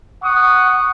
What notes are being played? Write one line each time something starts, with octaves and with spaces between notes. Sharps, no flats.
F#5 C#6 D#6